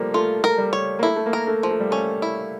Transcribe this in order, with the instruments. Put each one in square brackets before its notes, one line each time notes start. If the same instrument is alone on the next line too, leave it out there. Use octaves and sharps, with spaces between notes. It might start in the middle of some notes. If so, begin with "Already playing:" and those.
Already playing: [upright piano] F3 G3 A3 A#3
[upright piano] A3 [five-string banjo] F4
[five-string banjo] A#4
[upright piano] G3
[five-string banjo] C#5
[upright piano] A#3
[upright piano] A3 [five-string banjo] E4
[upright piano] A3
A#3
[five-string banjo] A#4
[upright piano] A3
[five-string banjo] F3
[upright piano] A3
G3
[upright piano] A3 [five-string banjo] C#4
[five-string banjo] E4